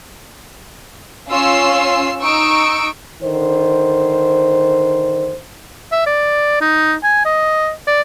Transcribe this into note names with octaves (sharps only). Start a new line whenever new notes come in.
C#4 F4 C#5 E6 C7
D#4 C#6 E6 D7
D3 D#3 C5
E5
D5
D#4
G#5
D#5
D5